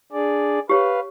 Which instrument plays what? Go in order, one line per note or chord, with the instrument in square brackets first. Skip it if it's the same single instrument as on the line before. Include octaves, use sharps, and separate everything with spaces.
[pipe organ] D4 G#4 D5
[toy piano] G4 C#5 [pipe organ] B4 F5